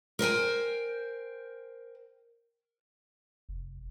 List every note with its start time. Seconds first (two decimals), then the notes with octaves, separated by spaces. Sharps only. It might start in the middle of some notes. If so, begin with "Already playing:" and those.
0.19 A#4 C5 G5 G#5
3.49 F1